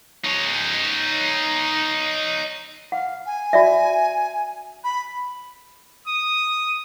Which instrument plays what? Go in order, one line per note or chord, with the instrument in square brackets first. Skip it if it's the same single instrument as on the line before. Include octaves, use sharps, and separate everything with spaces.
[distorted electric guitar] D#4 C#5
[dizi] F5 [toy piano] F#5
[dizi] G#5
[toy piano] F#4 D5 E5
[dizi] B5
[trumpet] D#6